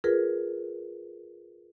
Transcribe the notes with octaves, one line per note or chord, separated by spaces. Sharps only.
F4 G#4 A#4 B4